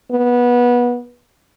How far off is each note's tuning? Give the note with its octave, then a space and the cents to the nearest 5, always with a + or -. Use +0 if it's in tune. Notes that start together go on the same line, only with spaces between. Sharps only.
B3 -20